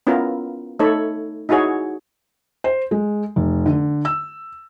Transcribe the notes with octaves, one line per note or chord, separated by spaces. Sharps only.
B3 C#4 E4 F4 A#4
A3 D#4 A4 C#5 B5
D#4 E4 F#4 G#4 C#5
C5
G#3
F1
D3
E6